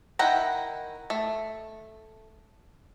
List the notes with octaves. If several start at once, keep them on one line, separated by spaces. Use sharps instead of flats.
D#3 E4 F#5 G5 A#5
A3